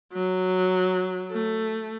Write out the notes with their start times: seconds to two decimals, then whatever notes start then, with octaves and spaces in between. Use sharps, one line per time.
0.13 F#3
1.32 A3